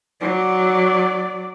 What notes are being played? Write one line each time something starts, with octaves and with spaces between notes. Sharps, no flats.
F#3 D5